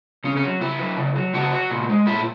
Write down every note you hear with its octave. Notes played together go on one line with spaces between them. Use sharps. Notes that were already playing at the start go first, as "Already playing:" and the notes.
C#3 C#4
C#4
F#3
C#3 E4
F#3
C#3
F#3
C#3 F#4
F#3
A#2
G#3
A#2 E4